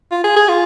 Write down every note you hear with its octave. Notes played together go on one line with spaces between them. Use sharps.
F4
G#4
G#4
F4